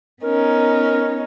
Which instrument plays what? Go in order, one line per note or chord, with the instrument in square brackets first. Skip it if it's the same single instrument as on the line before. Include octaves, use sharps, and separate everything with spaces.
[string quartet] B3 C#4 D#4 [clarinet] A#4